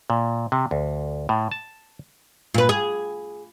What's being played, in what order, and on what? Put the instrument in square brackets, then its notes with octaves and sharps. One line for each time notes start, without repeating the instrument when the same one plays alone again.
[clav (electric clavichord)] A#2
C3
D2
A2
A5
[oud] A#2 B4
G#4